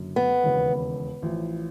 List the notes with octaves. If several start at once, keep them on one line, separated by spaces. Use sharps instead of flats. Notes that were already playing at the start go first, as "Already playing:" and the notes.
Already playing: F#1 F#2 D3
B3
E1 D#2 C#3
A1 A2 F3